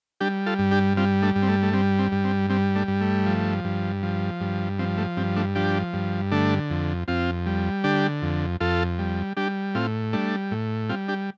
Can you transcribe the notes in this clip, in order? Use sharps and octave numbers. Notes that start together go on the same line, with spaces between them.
G3 D4 G4
F4 A4
G2
D4 G4
G3 C4 F4
A3 D4
G2
C4
A3
A3
G3 C4
C4
G2
C4
G3 C4
A3 D4
G2
A3
F3
G2
F3
G2
F3 C4
A3
G2 C4
A3 D4
F3 D4 G4
G2
D3 A3 D4
F2
F2 C4 F4
G3
D3 D4 G4
F2
F2 F4 A4
G3
G3 D4 G4
A2 C4 F4
G3 A3 D4
A2
G3 C4 F4
D4 G4